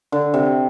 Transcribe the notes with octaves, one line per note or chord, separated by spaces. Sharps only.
D3
C3